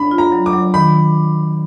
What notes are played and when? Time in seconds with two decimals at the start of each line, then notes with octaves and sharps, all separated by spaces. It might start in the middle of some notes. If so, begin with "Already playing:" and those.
Already playing: D4 B5
0.11 F4
0.18 A#5
0.32 F#3
0.46 D6
0.53 F#3
0.74 D#3 B5